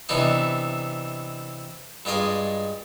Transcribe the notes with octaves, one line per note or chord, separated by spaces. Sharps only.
C3 E3 B3 D4 D#4
G2 G#3 F4 D5 D#5